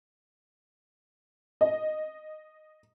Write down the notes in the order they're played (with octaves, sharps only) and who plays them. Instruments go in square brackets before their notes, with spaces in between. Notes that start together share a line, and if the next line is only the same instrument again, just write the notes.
[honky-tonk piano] D#5